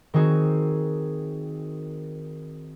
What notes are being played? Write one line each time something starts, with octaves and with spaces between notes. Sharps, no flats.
D#3 C4 F#4 G#4